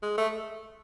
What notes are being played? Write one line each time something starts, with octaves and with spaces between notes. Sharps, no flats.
G#3
A3